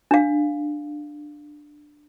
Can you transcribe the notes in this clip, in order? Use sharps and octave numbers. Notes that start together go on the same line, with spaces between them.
D4 F5